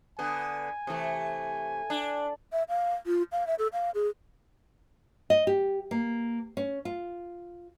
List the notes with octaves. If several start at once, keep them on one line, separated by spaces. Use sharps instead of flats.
D3 B3 G#5
C3 E3 A3
D4
E5
F5
F4
F5
E5
A4
F5
G#4
D#5
G4
A#3
C#4
F4